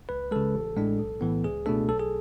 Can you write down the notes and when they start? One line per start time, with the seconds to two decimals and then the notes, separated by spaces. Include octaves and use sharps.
0.09 C#2 B4
0.31 C#3 G#3 A4
0.55 A1
0.77 A2 G#3 D4
0.99 B1
1.21 A2 E3 B3
1.44 C#2 G#4
1.66 B2 A3 D4 A4
1.89 B1 A4
2.00 G#4